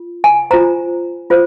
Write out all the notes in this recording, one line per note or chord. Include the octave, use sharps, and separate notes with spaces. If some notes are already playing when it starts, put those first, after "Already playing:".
Already playing: F4
G#5
F4 C5 A#5
F4 C5